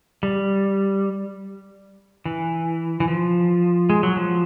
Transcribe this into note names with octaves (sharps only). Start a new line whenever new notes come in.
G3
E3
E3
F3
G#3
F#3
F3